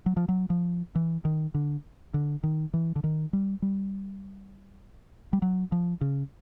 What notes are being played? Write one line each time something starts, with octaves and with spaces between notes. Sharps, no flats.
F#3
F3
F#3
F3
E3
D#3
D3
D3
D#3
E3
D3
D#3
G3
G3
G3
F#3
F3
C#3